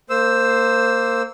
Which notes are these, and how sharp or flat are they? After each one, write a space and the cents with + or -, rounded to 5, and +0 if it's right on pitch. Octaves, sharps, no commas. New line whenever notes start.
A#3 -20 C5 +0 E6 +0